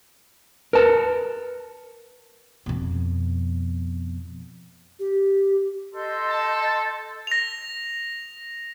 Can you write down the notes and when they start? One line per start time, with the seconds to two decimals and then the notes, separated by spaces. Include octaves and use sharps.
0.73 A#4 B4 A5
2.66 F2 B2
5.00 G4
5.94 A4 D#5 C6 G6
6.29 A5
7.27 A#6 F7